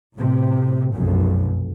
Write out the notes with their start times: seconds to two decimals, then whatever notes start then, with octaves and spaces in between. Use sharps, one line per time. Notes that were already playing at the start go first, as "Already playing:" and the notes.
0.16 A2 C3
0.93 F1 B1 F#2